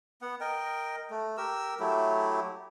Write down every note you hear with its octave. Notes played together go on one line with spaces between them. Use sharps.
B3 F#5
A#4 D#5 G5
A3
G4 A#4 E6
F#3 A3 E4 G4